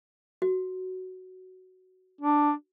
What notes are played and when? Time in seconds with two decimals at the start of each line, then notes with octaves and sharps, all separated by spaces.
0.42 F#4
2.21 D4